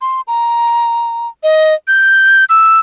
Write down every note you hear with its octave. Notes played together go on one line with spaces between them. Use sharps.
C6
A#5
D#5
G6
E6